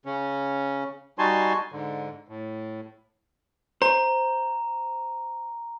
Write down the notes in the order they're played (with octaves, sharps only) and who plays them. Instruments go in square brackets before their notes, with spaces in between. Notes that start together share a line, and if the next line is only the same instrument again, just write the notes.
[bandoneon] C#3 C#4
G3 D#4 F#4 G#5 A5 C6
G#2 D3
A2
[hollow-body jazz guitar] C5 [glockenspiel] A#5